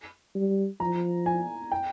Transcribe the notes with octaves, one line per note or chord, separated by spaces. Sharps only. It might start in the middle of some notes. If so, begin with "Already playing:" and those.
G3
F3 A#5
G#5
G5